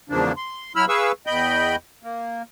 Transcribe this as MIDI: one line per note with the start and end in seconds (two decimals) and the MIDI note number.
0.10 0.32 40
0.10 0.32 44
0.10 0.32 49
0.10 0.32 53
0.10 0.32 58
0.10 0.32 62
0.37 0.73 84
0.76 0.85 54
0.76 0.85 64
0.76 0.85 83
0.76 0.85 88
0.76 0.85 89
0.89 1.12 68
0.89 1.12 71
0.89 1.12 77
0.89 1.12 85
0.89 1.12 88
1.27 1.76 40
1.27 1.76 75
1.27 1.76 79
1.27 1.76 83
1.27 1.76 91
2.03 2.42 58